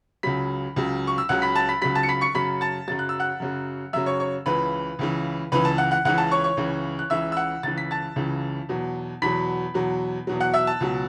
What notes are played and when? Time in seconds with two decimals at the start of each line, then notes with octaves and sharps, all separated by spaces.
0.23 C#2 C#3 F#3 B5 B6
0.76 C#2 C#3 F#3
1.07 C#6
1.18 E6
1.29 C#2 C#3 F#3 F#5 F#6
1.42 B5 B6
1.55 A5 A6
1.69 B5 B6
1.82 C#2 C#3 F#3 B5 B6
1.95 A5 A6
2.03 C#7
2.09 B5 B6
2.21 C#6 C#7
2.35 F#2 C#3 F#3 B5 B6
2.61 A5 A6
2.88 F#2 C#3 F#3 A6
2.99 F#6
3.09 E6
3.20 F#5 F#6
3.40 F#2 C#3 F#3
3.93 F#2 C#3 F#3 E5 E6
4.06 C#5 C#6
4.20 C#5 C#6
4.46 C#2 C#3 E3 B4 B5
4.99 C#2 C#3 E3
5.52 C#2 C#3 E3 B4 B5
5.65 A5
5.78 F#5 F#6
5.91 F#5 F#6
6.05 C#2 C#3 E3 F#5 F#6
6.18 A5
6.31 C#5 C#6
6.44 C#5 C#6
6.57 C#2 C#3 E3
6.99 F#6
7.10 C#2 C#3 E3 E5 E6
7.32 E6
7.37 F#5 F#6
7.63 C#2 C#3 E3 A6
7.78 B6
7.91 A5 A6
8.16 C#2 C#3 E3
8.69 E2 B2 F#3
9.22 E2 B2 F#3 B5 B6
9.74 E2 B2 F#3
10.27 E2 B2 F#3
10.40 F#5 F#6
10.54 E5 E6
10.67 A5
10.81 C#2 B2 F#3